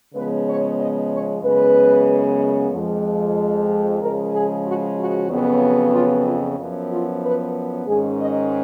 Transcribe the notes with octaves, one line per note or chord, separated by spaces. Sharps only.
C#3 F3 G#3 B3 B4
C#5
D#5
C#5
F#2 C#3 G#3 B3 B4
F2 F3 G#3
C#3 F3 G#3 A#4
G#4
F#4
F#4
F2 C#3 F#3 B3
F4
F4
F#2 F3 B3
F4
B4
G#2 D#3 G#3 C#4 G#4
D#5